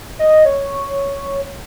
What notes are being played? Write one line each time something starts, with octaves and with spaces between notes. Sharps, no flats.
D#5
C#5